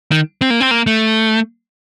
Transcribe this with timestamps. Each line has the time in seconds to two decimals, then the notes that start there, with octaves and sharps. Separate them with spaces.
0.12 D#3
0.42 C4
0.50 A#3
0.60 C4
0.71 A#3
0.87 A3